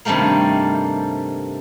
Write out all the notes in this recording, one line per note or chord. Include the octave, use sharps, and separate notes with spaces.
G2 C3 D#3 G3 A3 A#3